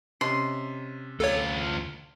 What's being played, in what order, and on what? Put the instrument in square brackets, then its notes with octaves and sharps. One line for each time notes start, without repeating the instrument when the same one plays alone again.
[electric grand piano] C3 C#4 D#5 [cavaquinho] C6
[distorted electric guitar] D2 F4 [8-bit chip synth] A4 C#5